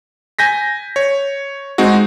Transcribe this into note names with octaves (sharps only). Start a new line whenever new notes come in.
G#5 G6 A#6 B6
C#5
G#3 C4 D#4 F#4